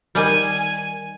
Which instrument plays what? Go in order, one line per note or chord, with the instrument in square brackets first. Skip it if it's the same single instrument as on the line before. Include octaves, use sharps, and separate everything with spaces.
[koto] D#3 G3 [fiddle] G#5